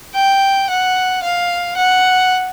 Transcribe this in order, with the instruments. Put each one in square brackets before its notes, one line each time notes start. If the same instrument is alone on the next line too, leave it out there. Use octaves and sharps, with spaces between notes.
[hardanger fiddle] G5
F#5
F5
F#5